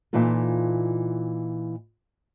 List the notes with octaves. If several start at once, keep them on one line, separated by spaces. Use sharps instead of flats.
A#2 E3 D#4 F4 A4